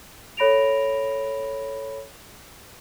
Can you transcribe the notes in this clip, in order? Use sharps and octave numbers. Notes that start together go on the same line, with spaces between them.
A4 C#5 B5 A#6 D7 F7